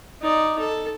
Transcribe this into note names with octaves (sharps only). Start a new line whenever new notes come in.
D#4 D5
A4